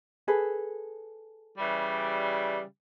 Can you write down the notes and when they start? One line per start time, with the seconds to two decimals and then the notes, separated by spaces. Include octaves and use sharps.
0.28 G#4 A4 B4
1.58 C#3 E3 G3